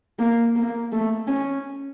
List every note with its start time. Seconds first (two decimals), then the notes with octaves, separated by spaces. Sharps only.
0.19 A#3
0.56 A#3
0.92 A3
1.27 C#4